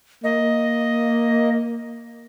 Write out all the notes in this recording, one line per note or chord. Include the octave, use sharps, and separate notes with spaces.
A#3 D#5